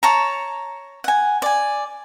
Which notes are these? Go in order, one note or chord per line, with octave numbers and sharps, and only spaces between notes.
C#5 A5 A#5
F#5 G#5
D5 G#5